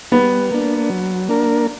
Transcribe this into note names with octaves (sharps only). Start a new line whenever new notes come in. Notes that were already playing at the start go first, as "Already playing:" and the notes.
G3 B3
A#3 D4
F#3
A#3 D4 A#4